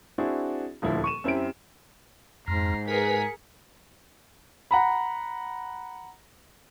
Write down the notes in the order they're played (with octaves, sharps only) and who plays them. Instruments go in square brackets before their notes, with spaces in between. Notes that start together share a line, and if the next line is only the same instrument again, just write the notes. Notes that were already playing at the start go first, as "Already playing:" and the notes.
[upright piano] C4 D4 E4 F#4 G#4
D#1 D2 F3 E4
C#6 D#7 E7
F#2 C4 E4 G4 D7
[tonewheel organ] F2 [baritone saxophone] G#2 [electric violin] A#5 C7
[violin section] G#4 A#4 [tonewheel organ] B4 [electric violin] B6 C#7
[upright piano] F#5 A#5 B5